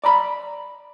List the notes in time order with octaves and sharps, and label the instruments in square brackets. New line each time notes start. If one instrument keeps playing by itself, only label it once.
[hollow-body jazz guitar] D5 A#5 B5